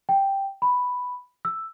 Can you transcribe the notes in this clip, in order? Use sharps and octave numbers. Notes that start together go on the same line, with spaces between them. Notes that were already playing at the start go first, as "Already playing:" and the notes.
G5
B5
E6